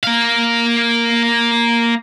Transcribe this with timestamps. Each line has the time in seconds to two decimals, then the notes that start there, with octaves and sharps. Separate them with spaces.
0.03 A#3 F5